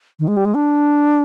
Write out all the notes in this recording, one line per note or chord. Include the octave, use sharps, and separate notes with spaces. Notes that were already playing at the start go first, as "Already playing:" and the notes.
D#3
G#3
G3
G#3
D4